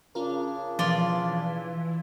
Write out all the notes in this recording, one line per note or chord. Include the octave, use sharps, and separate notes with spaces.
C#3 C#4 D4 F4 A#4
B2 E3 F3 F4 D5